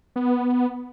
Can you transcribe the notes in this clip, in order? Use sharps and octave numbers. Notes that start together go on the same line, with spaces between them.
B3